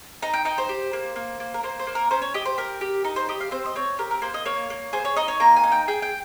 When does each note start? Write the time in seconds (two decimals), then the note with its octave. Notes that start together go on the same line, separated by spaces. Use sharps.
0.22 D#4 A#5
0.34 G5
0.45 D#4 G5
0.58 C5
0.69 G4
0.93 A#3
1.16 A#3
1.40 A#3
1.54 A#4
1.63 A#3 C5
1.79 C5
1.87 A#3
1.95 A#4
2.11 C#4 C5
2.22 C#5
2.34 G4 D#5
2.45 C5
2.58 G4 A#4
2.81 G4
3.05 D#4
3.16 C5
3.29 G4 D#5
3.40 F5
3.51 C4 C5
3.66 D#5
3.76 C4 C#5
3.99 G4 A#4
4.11 A#4
4.22 A#3 C5
4.34 D#5
4.45 A#3 C#5
4.70 A#3
4.93 G#4 C5
5.05 C#5
5.16 D#4 D#5
5.28 C#5
5.40 A#3 A#5
5.56 G#5
5.63 D#4
5.72 G5
5.88 G#4 G5
6.02 G5